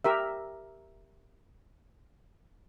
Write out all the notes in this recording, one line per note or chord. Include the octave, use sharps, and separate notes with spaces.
G4 A#4 E5